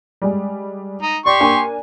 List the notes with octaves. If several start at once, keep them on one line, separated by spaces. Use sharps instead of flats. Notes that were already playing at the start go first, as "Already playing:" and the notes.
G3 G#3
D#4
G4 D5 C6 C#6
A#3 D4 G#5